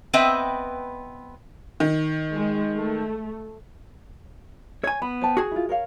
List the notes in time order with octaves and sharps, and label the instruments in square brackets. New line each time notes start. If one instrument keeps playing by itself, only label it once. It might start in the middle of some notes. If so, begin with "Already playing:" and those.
[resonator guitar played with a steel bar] B3 C4 B4 D#5 E5 G5
[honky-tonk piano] D#3
[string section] G#3
A3
[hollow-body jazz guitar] C#5 G#5
[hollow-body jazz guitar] B3 [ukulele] B5
[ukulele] C5 G5 A5
[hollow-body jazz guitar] F#4 G#4
[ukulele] E4 F4
A#4 C#5 F5